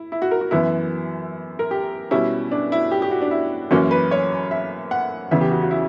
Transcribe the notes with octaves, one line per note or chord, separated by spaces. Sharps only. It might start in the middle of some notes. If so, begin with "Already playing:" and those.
Already playing: E4
E4
F#4
A#4
F#4
F#2 E3 B3 E4
A#4
G4
B2 G3 C#4 E4
D4
E4
G4
G4
F#4
D4
E4
F#2 E3 A#3 C#4 F#4
B4
C#5
E5
F#5
E2 C#3 E3 E5
G4
F#4
F#4
E4